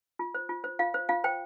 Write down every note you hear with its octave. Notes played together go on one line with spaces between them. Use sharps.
F4
C5
F4
C5
F4 F5
C5
F4 F5
C5 G5